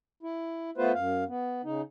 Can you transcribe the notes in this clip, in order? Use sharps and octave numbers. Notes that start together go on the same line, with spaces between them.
E4
A3 B3 F4 B4 C5
F#2 F5
B3
C#3 D#4